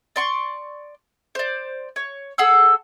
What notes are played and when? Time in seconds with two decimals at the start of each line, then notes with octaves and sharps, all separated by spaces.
0.16 D5 C6 C#6
1.35 C5 D5
1.96 C#5
2.38 G#4 A4 F#5 E6